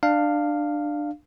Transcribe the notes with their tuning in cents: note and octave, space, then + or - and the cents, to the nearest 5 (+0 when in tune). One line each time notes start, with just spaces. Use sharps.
D4 +20 F5 +0